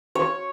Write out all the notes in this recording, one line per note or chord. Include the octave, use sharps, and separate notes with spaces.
C#5